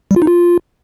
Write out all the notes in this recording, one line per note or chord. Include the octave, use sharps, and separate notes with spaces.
G3
F4
D#4
F4